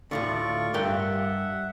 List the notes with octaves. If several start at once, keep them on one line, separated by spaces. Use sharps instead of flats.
D2 A2 D3 F4 D5 C#6
G2 A#4 E5 F#5 G5